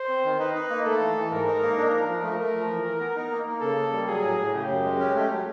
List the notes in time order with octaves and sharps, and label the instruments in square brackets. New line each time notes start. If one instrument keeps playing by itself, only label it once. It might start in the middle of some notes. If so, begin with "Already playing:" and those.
Already playing: [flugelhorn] C5
[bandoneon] C4
D#3
[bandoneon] D#4 [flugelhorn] B4
[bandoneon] D#4
A#3
[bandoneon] A3 [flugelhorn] A4
[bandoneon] E3
E3
[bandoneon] G#2 [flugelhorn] A#4
[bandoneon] D#4
A#3
[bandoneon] D4 [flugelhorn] A#4
[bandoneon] F3
F3
[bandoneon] A3 [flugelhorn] A#4
[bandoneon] A3
F3
E3
E3
B3
D#4
A#3
A#3
[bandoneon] C#3 [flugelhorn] A4
[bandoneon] A#3
G3
[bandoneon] F#3 [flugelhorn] G#4
[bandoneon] A2
A2
[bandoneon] C#3 [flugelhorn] G4
[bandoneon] F#2
G#3
C#4
A3
F#3